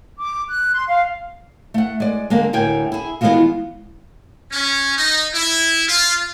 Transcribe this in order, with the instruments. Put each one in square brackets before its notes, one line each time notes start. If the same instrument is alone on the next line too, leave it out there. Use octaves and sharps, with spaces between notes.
[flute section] D6
F#6
C6
F5
[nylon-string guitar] A3 F#5
G#3 D5
D3 G#3 A#3
D2 A2 A#4 G5 G#5
E4 G#4
E3 G#3 A#3 B3 F4 F#4
[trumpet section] C#4
D#4
E4
F4